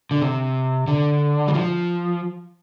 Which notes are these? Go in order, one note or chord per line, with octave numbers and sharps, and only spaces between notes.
D3
C3
D3
G3
F3